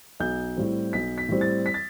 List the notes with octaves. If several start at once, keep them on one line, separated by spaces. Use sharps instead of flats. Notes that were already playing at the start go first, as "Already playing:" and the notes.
B1 G6
A2 G3 C4
B1 B6
B6
A2 G3 C4
A6
B6
A6